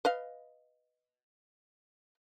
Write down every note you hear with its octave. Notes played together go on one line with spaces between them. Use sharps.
B4 D#5 F5